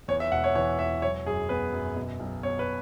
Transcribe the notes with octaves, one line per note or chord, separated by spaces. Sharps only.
E2 C#5
E5
E1 F#5
C#5
E3 C#5
E1 E5
F#3 C#5
F#2 G#4
B3 B4
F#2
B2
B1
B3 C#5
B4